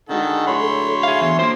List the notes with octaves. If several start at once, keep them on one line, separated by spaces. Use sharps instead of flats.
D3 D#3 G#3 F#4 A4 F#5
A2 F#3 C#5 B5 C6
A4
G#4 E5 F5
E2
F3 A#3 C5 C6